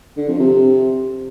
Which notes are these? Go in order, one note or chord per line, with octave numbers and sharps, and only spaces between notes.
D3
F2
C3